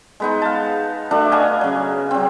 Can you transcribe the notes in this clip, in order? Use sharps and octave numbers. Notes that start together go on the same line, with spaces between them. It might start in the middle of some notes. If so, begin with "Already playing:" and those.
G#3 B3 D#4
F5 A5
A3 D4 F#4 E5
B4 D#5 F5 G#5
C#3 F#3
F#3 C4